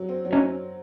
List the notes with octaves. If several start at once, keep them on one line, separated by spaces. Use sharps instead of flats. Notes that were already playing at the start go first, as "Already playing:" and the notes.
Already playing: F#3
C4
F#3
C#4 D#4